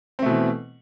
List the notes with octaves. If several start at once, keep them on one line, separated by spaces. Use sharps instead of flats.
B2 E3 A3 C4